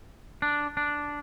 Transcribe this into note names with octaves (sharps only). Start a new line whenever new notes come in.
D4
D4